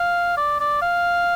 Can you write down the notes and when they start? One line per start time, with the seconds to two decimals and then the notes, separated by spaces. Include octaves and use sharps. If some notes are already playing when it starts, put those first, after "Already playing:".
Already playing: F5
0.37 D5
0.60 D5
0.82 F5